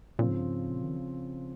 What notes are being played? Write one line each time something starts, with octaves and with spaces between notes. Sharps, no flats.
A#2 C#3 F3 C4
G#2
G2
G#2
A#2
D#3